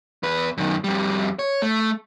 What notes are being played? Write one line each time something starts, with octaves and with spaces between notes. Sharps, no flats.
E2 B4
F#2 D#3
F2 G3
C#5
A3